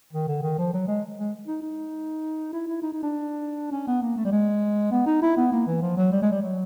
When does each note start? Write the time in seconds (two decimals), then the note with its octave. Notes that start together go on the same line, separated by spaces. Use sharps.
0.13 D#3
0.28 D3
0.43 D#3
0.58 F3
0.73 F#3
0.87 G#3
1.17 G#3
1.47 D#4
1.62 D#4
2.53 E4
2.68 E4
2.82 D#4
2.92 D#4
3.03 D4
3.72 C#4
3.87 B3
4.02 A#3
4.17 A3
4.25 G3
4.32 G#3
4.91 B3
5.07 D#4
5.22 E4
5.37 B3
5.52 A#3
5.67 E3
5.82 F3
5.97 F#3
6.12 G3
6.22 G#3
6.32 G3
6.42 F#3